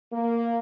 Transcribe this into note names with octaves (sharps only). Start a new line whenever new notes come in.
A#3